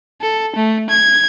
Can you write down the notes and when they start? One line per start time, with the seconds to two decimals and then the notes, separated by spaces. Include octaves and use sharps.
0.21 A4
0.55 A3
0.89 G#6